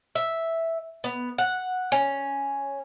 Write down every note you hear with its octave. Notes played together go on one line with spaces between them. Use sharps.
E5
B3
F#5
C#4